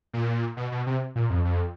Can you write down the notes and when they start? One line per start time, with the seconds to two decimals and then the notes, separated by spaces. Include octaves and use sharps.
0.13 A#2
0.57 B2
0.71 B2
0.86 C3
1.15 A#2
1.30 F2
1.45 F2